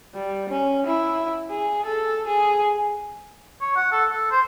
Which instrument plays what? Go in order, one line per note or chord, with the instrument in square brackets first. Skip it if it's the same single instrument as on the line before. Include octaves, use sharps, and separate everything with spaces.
[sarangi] G3
C#4
E4
G#4
A4
G#4
[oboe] C#5
F#5
A4
A4
C5